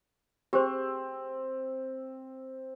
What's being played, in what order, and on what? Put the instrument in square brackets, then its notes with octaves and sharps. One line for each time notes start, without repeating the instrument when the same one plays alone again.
[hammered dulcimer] C4 [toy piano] G4 G#4 C5